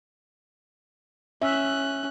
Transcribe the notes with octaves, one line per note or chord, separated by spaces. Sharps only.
C#4 E5 F#6